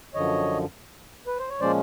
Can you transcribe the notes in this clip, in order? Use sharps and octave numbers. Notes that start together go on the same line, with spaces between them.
F#2 D3 F3 C#5 D#5
B4
C5
C#5
A#2 F3 G#3 C#4 C5 D5